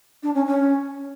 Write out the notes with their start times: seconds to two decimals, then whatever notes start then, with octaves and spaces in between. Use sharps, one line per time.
0.23 D4
0.35 C#4
0.46 C#4